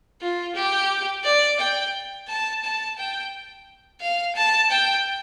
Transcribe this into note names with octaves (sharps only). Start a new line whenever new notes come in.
F4
G4
D5
G5
A5
A5
G5
F5
A5
G5